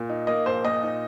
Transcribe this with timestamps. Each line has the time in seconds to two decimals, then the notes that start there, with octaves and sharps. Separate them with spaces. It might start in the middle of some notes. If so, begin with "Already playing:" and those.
Already playing: A#2
0.09 D#4
0.27 A#3 D#5
0.46 A#1 C5
0.65 A#2 D#5
0.83 D#4